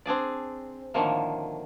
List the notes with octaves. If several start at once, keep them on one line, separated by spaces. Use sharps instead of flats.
C4 D4 G#4 D5
A2 D3 D#3 F3 A#3